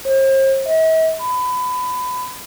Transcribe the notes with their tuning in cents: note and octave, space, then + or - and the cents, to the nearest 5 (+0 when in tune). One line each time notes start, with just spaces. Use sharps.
C5 +40
E5 -45
B5 +25